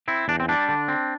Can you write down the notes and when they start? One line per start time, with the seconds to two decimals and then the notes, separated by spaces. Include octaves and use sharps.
0.08 C4 E4
0.28 E2 D4
0.40 C4
0.49 G3 D4
0.69 D3
0.88 C4